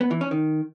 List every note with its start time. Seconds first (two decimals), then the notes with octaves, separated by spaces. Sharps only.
0.01 B3
0.11 E3
0.21 C#4
0.31 D#3